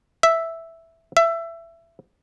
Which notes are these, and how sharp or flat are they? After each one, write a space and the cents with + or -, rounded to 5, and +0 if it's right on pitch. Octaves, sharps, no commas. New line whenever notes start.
E5 +0
E5 +20